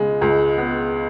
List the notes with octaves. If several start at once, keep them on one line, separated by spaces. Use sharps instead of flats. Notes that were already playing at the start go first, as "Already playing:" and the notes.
Already playing: C#2 C#3 G#3 B3
C#2
B3